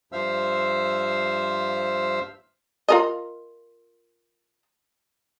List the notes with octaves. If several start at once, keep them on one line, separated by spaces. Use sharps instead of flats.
G2 F3 C5 E5 F5 E6
F4 A#4 D#5